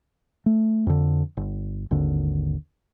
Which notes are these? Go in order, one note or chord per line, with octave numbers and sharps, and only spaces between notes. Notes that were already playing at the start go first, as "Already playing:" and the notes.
A3
F2 D3
G1
G#1 D#2 D3